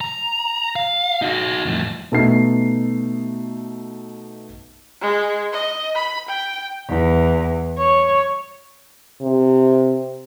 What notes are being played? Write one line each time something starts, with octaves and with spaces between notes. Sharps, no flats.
A#5
F5
D#4 F#4
F2 A2
B2 A3 D#4 C7
G#3
D#5
B5
G5
E2
C#5
C3